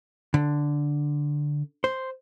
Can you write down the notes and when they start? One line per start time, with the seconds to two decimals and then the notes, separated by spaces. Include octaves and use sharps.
0.34 D3
1.84 C5